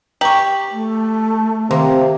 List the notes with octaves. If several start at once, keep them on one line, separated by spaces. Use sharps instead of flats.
G4 A#5 C#6
A3
C3 D#3 A#3